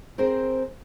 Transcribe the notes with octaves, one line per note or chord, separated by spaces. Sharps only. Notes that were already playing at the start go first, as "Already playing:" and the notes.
C4 G#4 A#4 C5